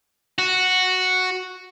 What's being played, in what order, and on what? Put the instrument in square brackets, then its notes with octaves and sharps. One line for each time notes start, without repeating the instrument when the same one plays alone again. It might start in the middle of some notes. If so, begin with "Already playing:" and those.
[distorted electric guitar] F#4